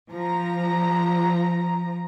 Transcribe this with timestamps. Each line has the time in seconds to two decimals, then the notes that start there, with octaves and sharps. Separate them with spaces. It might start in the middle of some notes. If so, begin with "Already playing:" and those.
0.10 F3 A#5